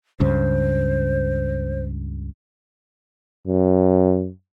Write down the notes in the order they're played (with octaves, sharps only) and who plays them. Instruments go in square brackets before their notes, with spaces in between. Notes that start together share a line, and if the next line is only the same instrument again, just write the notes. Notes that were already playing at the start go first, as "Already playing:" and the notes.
[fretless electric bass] C#2 G2 C#3 [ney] C5
[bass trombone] F#2